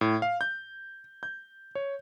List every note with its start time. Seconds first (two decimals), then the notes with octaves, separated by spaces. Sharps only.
0.01 A2
0.22 F5
0.41 G6
1.23 G6
1.75 C#5